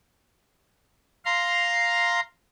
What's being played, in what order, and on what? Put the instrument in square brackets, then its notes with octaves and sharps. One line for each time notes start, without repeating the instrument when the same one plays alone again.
[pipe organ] F5 A#5 C6